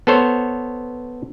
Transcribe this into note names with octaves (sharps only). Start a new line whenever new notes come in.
B3 A4 C5 C#5